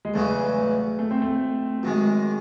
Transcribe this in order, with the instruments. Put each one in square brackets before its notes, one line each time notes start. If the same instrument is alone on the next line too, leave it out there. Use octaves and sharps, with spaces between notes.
[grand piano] G#3
[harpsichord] E2 C#3 F#3 C#4 [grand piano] A3
[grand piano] A3
A3
C4
A3
[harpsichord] F#2 D#3 G#3 [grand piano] F#3